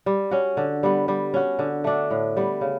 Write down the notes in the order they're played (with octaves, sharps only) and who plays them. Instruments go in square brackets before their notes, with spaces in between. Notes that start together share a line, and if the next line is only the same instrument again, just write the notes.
[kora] G3
C#4 F#4
D3
G3 B3
G3
C#4 F#4
D3
A3 D4 F#4
A2
G3 B3
C#3